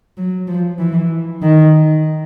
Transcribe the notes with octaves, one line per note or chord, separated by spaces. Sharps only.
F#3
F3
E3
D#3